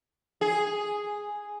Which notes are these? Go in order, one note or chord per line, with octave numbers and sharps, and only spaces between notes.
G#4